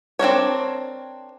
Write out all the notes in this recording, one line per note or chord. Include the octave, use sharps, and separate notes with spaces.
C4 D4 A#4 C#5